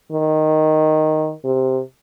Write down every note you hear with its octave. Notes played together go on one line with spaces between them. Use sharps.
D#3
C3